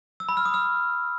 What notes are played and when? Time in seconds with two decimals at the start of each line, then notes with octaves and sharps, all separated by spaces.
0.20 E6
0.29 B5
0.37 F6
0.45 D#6
0.54 F6